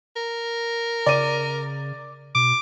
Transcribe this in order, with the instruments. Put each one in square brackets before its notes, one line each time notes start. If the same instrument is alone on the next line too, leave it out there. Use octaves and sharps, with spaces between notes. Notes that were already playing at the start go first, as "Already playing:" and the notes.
[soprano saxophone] A#4
[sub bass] C#3 [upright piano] D5 D#7
[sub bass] B2 [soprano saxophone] D6